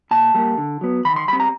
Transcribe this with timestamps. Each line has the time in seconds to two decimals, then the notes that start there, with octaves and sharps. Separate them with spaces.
0.11 A#2 A5
0.34 G3 A#3
0.58 D3
0.81 F#3 B3
1.05 D#3 B5
1.16 C6
1.28 G3 C4 B5
1.40 A#5